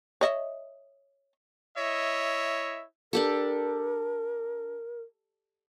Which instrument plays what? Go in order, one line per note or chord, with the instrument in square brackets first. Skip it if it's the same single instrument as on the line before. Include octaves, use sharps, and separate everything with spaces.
[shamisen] C#5 D#5 E5
[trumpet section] E4 C#5 D#5 E5
[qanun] D4 G4 A4 [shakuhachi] A#4